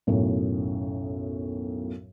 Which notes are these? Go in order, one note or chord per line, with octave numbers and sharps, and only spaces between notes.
B1 F#2 A2